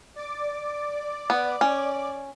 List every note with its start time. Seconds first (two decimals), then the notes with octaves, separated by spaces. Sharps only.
0.16 D5 D6
1.30 B3
1.61 C#4